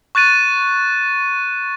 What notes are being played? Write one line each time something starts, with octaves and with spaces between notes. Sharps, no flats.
C#6 F#6 A6 D#7